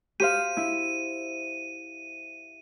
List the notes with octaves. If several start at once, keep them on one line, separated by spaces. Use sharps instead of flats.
G4 C5 F5 D#7
E4